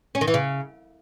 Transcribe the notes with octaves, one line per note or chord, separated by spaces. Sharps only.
C#4
D#3
E3
C#3